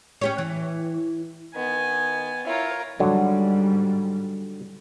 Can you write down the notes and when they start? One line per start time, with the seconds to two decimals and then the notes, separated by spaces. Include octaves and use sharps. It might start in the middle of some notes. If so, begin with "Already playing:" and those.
0.21 C#4 G4 C#5
0.38 E3
1.55 D#3 B3 G#5
2.47 E4 F4 A#4 C#5
3.00 G#2 D3 F#3 G3